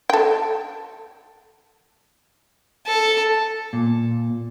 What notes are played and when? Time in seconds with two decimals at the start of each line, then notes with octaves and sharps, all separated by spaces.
0.10 A4 G5
2.87 A4
3.73 A#2